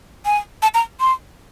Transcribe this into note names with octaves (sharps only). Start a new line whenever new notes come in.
G#5
A5
A#5
C6